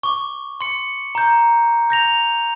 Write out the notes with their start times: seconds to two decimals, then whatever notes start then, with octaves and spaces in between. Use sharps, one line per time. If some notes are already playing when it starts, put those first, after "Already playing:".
0.03 C#6 D6
0.61 C6 C#7
1.15 A#5 G6
1.90 G6 A#6 F7